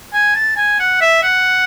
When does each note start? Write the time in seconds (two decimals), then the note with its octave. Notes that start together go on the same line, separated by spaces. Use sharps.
0.13 G#5
0.35 A5
0.57 G#5
0.80 F#5
1.01 E5
1.23 F#5